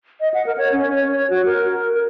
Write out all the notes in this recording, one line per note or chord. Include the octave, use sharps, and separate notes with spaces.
D#5
F#5
A#4
C#5
C#4
C#5
C#5
F#4
A#4
A#4